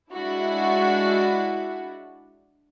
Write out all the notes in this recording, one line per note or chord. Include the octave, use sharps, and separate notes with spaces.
G#3 D4 E4 F#4